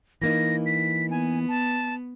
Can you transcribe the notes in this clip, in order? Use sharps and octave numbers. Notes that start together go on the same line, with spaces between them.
E3 A#3 D#4 A#6
B6
B3 G#5
A5